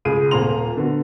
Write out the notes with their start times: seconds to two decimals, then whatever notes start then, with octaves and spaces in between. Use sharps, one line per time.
0.05 C#2 G#4 D#7
0.31 D#1 A#2 C4 A#5 C6 F7
0.77 D3 B3 F#4